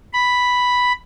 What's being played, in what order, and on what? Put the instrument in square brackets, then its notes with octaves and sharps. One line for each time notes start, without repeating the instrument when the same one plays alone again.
[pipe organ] B5